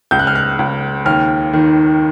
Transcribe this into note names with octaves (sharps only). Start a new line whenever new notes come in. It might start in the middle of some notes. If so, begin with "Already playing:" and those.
C#2 G6
F#6
F6
F#6
C#2
D#2 F6
D#3